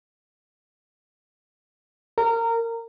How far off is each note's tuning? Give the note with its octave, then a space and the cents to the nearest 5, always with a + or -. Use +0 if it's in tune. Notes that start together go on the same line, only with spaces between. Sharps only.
A#4 -20